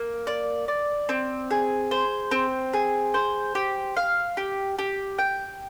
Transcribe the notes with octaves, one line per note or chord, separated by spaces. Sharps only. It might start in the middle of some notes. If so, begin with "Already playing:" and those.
Already playing: A#3
D5
D5
C4
G#4
C5
C4
G#4
C5
G4
F5
G4
G4
G5